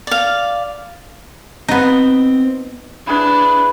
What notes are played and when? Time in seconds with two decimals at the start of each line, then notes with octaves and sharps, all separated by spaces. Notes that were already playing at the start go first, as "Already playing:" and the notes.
0.07 D5 F5
1.68 B3 C4 D#4
3.07 D4 E4 G#4 B4